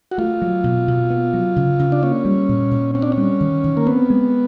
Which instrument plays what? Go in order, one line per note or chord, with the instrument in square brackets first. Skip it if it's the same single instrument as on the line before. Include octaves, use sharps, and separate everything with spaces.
[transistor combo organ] F#4
[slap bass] A3 [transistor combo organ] F4
[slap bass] F#3
B2
B2
B3
F#3
C#3
C#3
[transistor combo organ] D4
[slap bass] A#3 [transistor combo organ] C#4
[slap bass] G3
A#2
A#2
[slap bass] C4 [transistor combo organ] C#4
[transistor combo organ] D4
C#4
[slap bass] G3
D#3
D#3
[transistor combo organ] A#3
[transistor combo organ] B3 [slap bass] C4
[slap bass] G#3